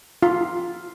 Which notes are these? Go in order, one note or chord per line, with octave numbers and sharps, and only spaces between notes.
F4